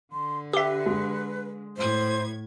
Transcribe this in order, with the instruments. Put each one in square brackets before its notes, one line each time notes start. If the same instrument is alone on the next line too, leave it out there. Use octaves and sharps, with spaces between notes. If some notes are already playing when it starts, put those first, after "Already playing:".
[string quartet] D3 [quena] C6
[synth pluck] G4 E5 [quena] B4
[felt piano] G#3
[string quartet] A2 G#6 [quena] C5